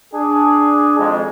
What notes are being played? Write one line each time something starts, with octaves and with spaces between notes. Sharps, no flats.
D4 G#4
G#1 F2 G#3